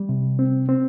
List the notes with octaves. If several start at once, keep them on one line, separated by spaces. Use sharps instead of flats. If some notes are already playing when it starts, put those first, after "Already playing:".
Already playing: G3
C3
C4
C4